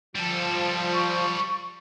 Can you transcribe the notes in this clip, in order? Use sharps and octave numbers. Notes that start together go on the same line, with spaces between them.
F3 G3 A4
C#6